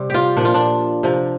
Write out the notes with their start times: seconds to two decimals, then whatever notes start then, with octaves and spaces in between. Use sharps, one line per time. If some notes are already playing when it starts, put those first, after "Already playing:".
Already playing: C3 G3
0.10 F4 G4
0.37 A#2 F3 D4
0.45 F4
0.54 D4
1.03 C3 F3